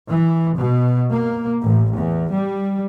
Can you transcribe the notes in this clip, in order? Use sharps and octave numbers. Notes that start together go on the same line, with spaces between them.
E3
B2
A#3
A1
E2
G3